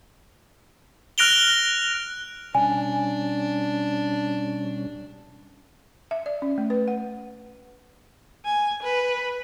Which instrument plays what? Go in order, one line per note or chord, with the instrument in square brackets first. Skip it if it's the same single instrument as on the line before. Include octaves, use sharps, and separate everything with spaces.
[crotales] F6 F#6 A#6 D7 F7 G7
[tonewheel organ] B2 G3 C#4 [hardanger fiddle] D4 [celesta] G#5
[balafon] E5
D5
C#4
A3
B4
F#5
[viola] G#5
B4